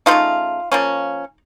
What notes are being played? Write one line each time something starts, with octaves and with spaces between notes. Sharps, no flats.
F3 A3 D#4 F4
C#3
F3 A#3 C#4